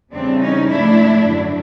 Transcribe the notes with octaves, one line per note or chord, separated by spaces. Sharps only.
E2 C#3 E3 G3 C4 D4
C#4 D#4
G#2 F3 A3 D4 E4
F#2 D3 F#3